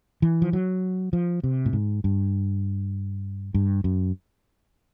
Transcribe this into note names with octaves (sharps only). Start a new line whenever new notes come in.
E3
F3
F#3
F3
C3
A2
G#2
G2
G2
F#2